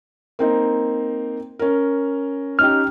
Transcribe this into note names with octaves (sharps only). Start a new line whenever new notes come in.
A#3 C4 D#4
C#4 A#4
C#4 D#4 G4 F6